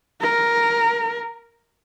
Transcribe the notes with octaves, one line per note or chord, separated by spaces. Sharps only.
A#4